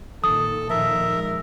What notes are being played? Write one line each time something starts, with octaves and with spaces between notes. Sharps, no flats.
A#2 D#3 A4 D#6
A#2 D#3 F3 A#4 E5
G#3